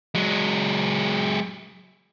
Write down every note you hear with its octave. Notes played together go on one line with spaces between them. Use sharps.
F#3 G#3